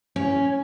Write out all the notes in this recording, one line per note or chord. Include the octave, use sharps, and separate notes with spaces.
C#4